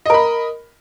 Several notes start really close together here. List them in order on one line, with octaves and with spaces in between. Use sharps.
D#5 A#4 B5